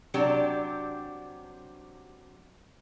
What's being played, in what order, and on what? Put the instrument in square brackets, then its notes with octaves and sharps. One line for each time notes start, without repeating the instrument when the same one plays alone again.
[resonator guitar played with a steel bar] C3 F#3 D4 G4 D5